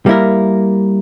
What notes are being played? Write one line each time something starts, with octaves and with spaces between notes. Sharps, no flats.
G3 A#3 E4 A#4